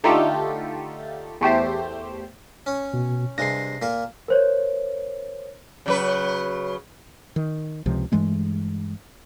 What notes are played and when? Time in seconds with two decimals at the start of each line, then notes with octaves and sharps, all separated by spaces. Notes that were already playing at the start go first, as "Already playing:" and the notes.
0.04 D3 A3 D#4 F4 G4 A4
1.41 E2 A3 G4 C5
2.66 C#4 C#5
2.94 B2
3.38 G2 C3 G#3 A#6 C7
3.82 A#2 A#3 A#4
4.28 A#4 C5 C#5
5.86 C#3 F#3 B4
7.36 D#3
7.86 C#2 C3 F3
8.12 G2 E3 G#3 A3